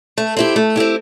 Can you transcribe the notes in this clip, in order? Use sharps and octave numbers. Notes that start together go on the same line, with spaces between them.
A3
C4 E4 G4
A3
C4 E4 G4